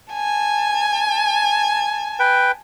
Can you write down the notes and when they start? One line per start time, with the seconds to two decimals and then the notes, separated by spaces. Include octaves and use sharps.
0.13 G#5 A5
2.20 B4 G5